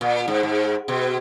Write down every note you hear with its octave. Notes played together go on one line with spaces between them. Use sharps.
A#2
G#2
G#2
B2